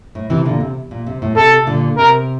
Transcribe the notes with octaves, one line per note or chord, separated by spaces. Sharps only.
A2
C3 E3
A#2 D3
C3
A#2
C3
A2
C3 A4
A#2 D3
C3 A#4